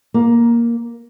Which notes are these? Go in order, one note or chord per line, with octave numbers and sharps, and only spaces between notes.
A#3